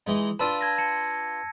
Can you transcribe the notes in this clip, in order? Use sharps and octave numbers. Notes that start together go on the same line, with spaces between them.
E3 G#3 D#4
D4 F4 B4 A5 E6 D#7
A5 G#6 A#6
A5 C#7